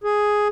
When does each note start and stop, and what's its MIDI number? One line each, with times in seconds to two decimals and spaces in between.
0.04 0.48 68